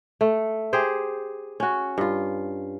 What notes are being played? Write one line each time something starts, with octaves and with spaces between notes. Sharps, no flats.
A3
G4 G#4 C5
C#4 F#4
G2 F4